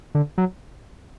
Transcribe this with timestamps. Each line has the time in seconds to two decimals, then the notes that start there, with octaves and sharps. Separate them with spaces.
0.15 D3
0.38 F#3